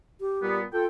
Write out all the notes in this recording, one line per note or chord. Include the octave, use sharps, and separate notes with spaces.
G4
A#2 G3 B3
F4 A4 G5